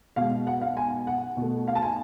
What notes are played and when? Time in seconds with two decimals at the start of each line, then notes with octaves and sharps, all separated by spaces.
0.16 B2 G#3 F5
0.47 F#5
0.62 F5
0.77 G#5
1.07 F#5
1.37 B2
1.42 A3
1.68 F5
1.75 A5
1.82 G#5